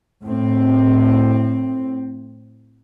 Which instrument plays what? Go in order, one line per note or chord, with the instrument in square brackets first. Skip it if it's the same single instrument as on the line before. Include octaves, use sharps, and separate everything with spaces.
[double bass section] A2 C4